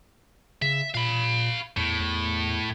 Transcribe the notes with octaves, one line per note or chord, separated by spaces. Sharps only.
C#3 E5
A#2 F5 B5
E2 A2
E2